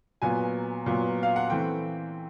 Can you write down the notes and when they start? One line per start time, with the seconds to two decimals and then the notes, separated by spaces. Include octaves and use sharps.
0.22 A#2 F#3 B3 G#5
0.86 A#2 F#3 B3
1.23 F5
1.36 F#5
1.50 E3 A3 C4 G5